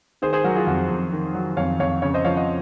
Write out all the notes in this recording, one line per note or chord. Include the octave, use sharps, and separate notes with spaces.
D#3 G#4 C5
G#4 C5
F#3 F#4 A#4
F4 G#4
F2 F#4
F2
D#3
F#3
F2 C#5 F5
F2 C#5 F5
C#3 C#5 F5
C5 D#5
F3 C#5 F5
D#5 F#5